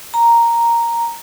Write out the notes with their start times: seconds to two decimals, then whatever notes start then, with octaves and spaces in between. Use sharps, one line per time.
0.14 A#5